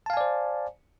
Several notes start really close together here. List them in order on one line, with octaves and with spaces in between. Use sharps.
A5 F5 G#5 D5 C5